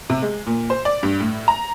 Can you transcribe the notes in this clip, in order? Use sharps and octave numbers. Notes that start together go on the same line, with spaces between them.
C3
G#3
A#2
C5
D5
G2
A2
A#5